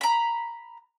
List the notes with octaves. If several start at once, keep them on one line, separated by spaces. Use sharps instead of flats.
A#5 B5